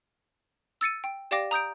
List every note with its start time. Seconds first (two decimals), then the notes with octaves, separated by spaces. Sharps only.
0.81 E6 A6 C#7 D#7
1.04 G5
1.31 G4 D5 F5 G5 D6 A#6
1.51 A#5 D#6 G6 D7